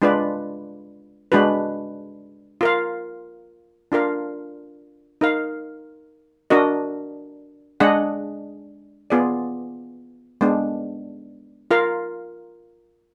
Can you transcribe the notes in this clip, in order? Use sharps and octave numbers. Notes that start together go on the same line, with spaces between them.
G#3 D4 F4 B4 D5
G#3 D4 F#4 B4
F4 A#4 F5
D4 F4 A#4 F5
D#4 A#4 F5
D4 F#4 A#4 D#5
G#3 D4 G#4 D#5 F#5
B3 F4 G#4 D5
G#3 B3 D4
F4 A#4 F5